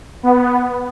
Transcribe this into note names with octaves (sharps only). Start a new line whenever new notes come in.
B3